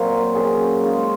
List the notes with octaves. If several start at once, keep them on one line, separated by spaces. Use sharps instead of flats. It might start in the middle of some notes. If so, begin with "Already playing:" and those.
Already playing: A#2 F#3 A#3 C4 A#4
F#3 C#4 G#4
G#3 C#4 F4